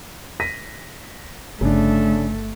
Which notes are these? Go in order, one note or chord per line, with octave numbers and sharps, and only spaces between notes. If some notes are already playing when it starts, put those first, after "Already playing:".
A#6 B6 D#7
G1 C#3 A3 D4